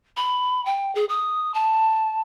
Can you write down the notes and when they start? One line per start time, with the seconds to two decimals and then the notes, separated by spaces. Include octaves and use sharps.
0.17 B5
0.65 G5
0.95 G#4
1.09 D#6
1.54 A5